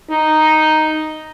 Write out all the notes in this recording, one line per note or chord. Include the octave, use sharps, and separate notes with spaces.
D#4